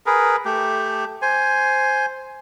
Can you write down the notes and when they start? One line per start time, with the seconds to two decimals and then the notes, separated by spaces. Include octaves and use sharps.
0.06 G#4 A#4 B4
0.45 A3 G4
1.22 C5 G#5